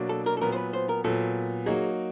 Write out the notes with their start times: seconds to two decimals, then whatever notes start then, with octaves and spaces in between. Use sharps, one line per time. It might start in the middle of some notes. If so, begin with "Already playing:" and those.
Already playing: B2 F#3 A#3 D4
0.09 A4
0.26 A#4
0.37 A4
0.41 A#2 F#3 B3 A#4
0.52 C5
0.57 B4
0.73 C5
0.89 A#4
1.04 A#2 F#3 B3 A4
1.66 F#3 A#3 D#4 F#4 G#4